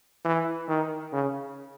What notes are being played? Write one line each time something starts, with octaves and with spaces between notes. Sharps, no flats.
E3
D#3
C#3